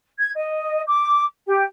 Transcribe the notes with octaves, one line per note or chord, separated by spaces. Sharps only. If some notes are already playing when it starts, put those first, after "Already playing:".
G#6
D#5
D6
G4